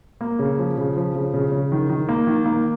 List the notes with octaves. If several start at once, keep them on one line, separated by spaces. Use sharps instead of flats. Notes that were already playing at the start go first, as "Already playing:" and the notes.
A#3
C#3
F3
C#3
F3
C#3
C#3
C#3
D#3
D#3
A#3
D#3
A#3